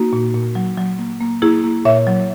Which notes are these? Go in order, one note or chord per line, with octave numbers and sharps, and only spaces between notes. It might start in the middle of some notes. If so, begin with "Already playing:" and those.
Already playing: A#3 D#4 F#4
A#2
A#2
F#3
F#3
A#3
A#3
A#3 E4 G#4
A#3
A#2 C#5 E5
F#3